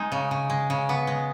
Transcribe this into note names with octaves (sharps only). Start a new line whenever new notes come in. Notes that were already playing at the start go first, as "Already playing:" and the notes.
Already playing: G#3 D#4
C#3
C#3
G#3
C#3
B3
G#3